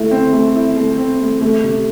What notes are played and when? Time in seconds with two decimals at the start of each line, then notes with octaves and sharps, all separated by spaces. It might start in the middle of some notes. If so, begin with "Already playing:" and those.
Already playing: A3 E4
0.11 C4
0.33 A3
0.55 E4
0.77 A3
0.98 C4
1.20 A3
1.41 A3
1.63 C3